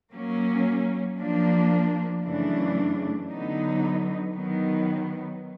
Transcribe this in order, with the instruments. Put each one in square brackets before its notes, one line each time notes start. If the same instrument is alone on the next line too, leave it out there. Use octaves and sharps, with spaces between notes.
[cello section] F#3 A#3 C#4
F3 A#3 D4
F#2 C#3 E3 A3 D4
D3 F#3 B3 D#4
D#3 F#3 B3